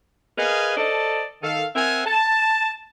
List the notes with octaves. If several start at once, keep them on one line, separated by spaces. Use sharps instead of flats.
G#4 A#4 B4 D#5 F5 G#5
A4 C5 D5 D#5 A5
D#3 A4 F5
C4 A#4 C5 E5 F#5 G#5
A5